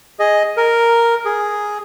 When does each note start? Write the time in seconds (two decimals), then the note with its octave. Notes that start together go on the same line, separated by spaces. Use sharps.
0.19 G#4 D#5
0.57 A#4
1.25 G#4